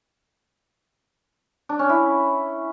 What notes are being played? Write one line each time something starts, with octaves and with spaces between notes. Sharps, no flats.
D4
C#4
E4